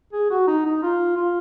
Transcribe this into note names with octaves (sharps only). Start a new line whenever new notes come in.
G#4
F#4
D#4
D#4
F4
F4